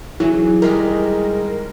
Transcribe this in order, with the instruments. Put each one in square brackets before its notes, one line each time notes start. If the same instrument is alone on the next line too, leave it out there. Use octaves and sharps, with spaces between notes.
[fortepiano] E3 [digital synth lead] F#3 [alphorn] G#4
[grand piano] D#3 G3 G#3 [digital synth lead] A#4